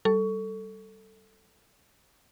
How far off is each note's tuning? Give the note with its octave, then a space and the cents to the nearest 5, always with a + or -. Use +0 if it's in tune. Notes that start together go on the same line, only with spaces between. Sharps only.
G3 -20 A4 +5 C#6 +20